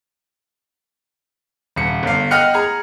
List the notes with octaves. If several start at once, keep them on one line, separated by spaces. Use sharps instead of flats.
D#1 C#7
G1 F5
D#5 F#5 G5 F6 F#6 C#7
G#4 A#5